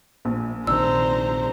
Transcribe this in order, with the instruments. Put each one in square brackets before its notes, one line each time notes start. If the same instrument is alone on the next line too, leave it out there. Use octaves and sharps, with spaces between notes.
[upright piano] A#1
[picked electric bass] A#1 C3 D#3 [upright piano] D4 [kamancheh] C5 A#5 [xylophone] E6